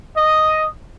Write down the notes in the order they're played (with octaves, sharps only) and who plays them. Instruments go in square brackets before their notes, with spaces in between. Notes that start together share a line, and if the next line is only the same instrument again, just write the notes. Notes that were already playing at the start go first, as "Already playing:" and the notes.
[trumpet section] D#5